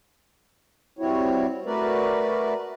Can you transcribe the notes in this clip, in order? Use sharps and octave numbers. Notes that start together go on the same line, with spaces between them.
G3 C4 E4 F#4 C#5
A3 F#4 A#4 B4 D5